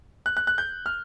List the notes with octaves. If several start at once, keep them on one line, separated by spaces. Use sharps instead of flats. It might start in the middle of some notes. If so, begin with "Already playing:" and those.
F#6
F#6
F#6
G6
F6